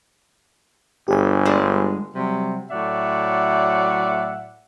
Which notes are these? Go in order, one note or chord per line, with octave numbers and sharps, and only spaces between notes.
G1 G4 G#4 G#5
G3 G#3 D4
C3 F#3 G3
A2 F#3 A3 D5 E5 F#5